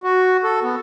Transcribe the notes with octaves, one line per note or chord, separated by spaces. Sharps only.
F#4
A4
B3